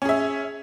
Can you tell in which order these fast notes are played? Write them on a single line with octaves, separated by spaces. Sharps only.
C#4 G#4 E5